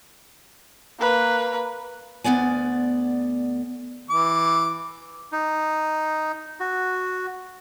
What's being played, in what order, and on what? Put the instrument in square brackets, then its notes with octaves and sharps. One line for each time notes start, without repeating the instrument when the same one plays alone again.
[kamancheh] A#3 B4
[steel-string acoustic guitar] D2 C3 B3 D5 G#5
[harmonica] E3 D6
[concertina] D#4
F#4